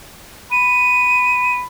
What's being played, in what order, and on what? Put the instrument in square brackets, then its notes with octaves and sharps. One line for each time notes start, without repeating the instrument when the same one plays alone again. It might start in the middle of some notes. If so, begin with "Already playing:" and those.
[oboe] B5 [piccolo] D#7